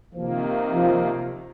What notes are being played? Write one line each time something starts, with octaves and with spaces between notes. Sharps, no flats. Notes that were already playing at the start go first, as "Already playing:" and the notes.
C3 D#3 F3 A#3
F3